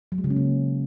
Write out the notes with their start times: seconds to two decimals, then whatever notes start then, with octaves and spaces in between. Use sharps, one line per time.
0.12 F#3
0.18 G#3
0.24 C#3
0.30 C#4
0.36 A#3